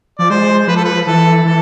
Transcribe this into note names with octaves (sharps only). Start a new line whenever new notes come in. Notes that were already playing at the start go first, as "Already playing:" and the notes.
F3 D5
G#3 C5
F3 B4
A4
B4
E3 A4
E3 A4